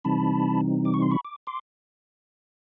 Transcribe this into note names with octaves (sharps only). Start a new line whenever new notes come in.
C3 E3 G3 C4 D#4 A5 B5
D6
C#6
C6
B5 C#6
D6
C6 D6